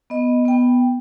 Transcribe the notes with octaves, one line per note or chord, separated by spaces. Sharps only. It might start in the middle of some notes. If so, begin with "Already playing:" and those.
B3 D#5
B3 G5